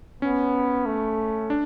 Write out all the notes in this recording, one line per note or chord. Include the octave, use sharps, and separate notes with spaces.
B3 C#4
A3
D4